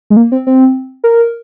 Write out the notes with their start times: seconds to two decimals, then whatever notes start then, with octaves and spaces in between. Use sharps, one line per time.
0.10 G#3
0.17 A#3
0.32 C4
0.47 C4
1.04 A#4